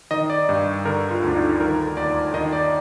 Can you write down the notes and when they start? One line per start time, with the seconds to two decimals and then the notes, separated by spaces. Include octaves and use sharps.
0.11 D#3 D#5
0.30 D5
0.49 G2
0.85 D3 A#4
1.11 F4
1.23 D2 D4
1.35 D#4
1.60 D#3 A#4
1.97 D#2 D5
2.34 D#3 D#5
2.53 D5